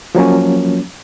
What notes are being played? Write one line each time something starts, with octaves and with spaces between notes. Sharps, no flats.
F3 F#3 A#3 C#4